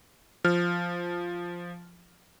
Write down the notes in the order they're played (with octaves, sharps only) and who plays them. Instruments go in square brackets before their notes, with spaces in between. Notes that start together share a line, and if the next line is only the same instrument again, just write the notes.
[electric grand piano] F3 F6